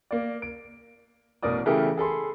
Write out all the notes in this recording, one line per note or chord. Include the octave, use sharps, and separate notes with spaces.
A#3 D5
D7
A1 B2 A#4 D5 D#6
C#3 E3 A3 G4 A4 A#4
G#4 A4 B5 C6